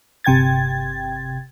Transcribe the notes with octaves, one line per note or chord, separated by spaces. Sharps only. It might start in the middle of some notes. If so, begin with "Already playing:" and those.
G1 C3 G5 G#6 A6